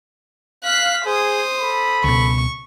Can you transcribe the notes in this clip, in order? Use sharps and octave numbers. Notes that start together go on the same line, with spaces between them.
F5 F#6 B6
G#4 C5 D#6
A4 B5
C#2 B2 C#6